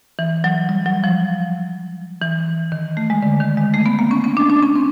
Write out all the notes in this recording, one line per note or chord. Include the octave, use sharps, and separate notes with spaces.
E3
F#3
G3
F#3
F3
E3
D#3
A3
G#3
D3
D#3
G#3
A3
B3
A#3
C#4
C#4
D4
D4
C#4
C4